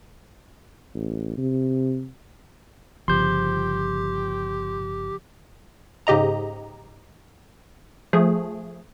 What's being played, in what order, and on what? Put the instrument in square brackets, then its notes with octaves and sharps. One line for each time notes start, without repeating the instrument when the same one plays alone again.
[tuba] A1
C3
[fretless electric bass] G1 [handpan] C#3 F3 [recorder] G4 [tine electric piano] C6 G6
[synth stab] G#2 C#3 G4 D#5 A#5
F3 A3 G#4